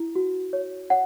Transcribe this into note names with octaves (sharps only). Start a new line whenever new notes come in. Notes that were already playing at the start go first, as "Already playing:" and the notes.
Already playing: E4
F#4
C#5
C#5 F#5